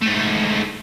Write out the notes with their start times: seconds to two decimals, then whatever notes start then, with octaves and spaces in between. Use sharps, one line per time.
0.01 G#2 A3